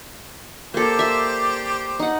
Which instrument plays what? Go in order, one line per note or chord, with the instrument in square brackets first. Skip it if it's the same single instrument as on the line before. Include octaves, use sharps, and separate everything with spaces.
[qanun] A#3 A4 [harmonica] G4 C5 D5
[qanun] E5 C6
D#4 F#5